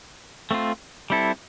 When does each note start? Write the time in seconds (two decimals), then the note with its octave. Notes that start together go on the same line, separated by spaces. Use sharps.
0.51 A3 C4 F4
1.10 G3 C4 E4 A4